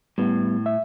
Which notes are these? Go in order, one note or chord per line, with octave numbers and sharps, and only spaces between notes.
A2 G3 B3
E5